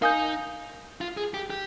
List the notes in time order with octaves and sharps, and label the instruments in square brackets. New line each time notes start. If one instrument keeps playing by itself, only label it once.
[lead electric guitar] D#4 [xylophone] A#4 F5 G#5 D#6 G6
[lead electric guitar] F4
G#4
G4
G4